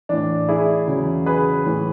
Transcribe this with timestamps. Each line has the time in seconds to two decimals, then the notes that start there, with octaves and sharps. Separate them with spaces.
0.09 A2 E3 D4
0.49 E4 G#4
0.87 E2 C#3 F#3
1.26 G#4 B4
1.65 A2 E3